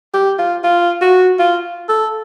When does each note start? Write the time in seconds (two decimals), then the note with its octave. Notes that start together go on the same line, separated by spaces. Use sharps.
0.14 G4
0.38 F4
0.64 F4
1.01 F#4
1.39 F4
1.89 A4